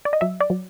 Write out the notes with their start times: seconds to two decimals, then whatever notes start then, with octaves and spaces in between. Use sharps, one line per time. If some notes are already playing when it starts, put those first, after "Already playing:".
0.05 D5
0.13 D#5
0.21 F#3 E5
0.41 D5
0.50 F#3